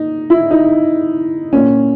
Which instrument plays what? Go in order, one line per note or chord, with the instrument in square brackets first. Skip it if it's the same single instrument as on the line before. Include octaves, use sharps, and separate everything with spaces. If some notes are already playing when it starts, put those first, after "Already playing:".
Already playing: [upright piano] A#3 D#4
E4
D#4
A#2 A#3 C#4